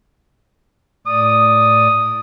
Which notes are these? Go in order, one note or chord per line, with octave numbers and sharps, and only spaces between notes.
A2 D5 D#6